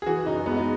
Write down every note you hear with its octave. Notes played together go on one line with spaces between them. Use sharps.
G#4
E3 F#4
F#2 D#4
G#3 B3
D#4